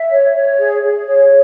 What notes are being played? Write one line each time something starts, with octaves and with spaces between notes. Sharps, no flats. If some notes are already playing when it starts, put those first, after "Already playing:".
Already playing: E5
C#5
C#5
G#4
G#4
C#5